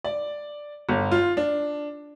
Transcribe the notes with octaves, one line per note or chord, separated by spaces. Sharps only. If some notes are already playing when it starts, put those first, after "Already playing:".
D5
G1
F4
D4